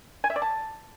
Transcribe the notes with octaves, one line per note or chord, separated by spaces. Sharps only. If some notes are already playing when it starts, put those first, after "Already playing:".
G#5
E5
D5
A5